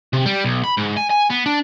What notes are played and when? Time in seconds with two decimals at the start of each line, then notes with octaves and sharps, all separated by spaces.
0.13 C3
0.26 G3
0.44 B1
0.64 B5
0.77 G#2
0.97 G#5
1.10 G#5
1.30 B3
1.46 D4